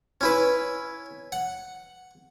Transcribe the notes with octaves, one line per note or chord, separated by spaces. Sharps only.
C#4 E4 B4
F#5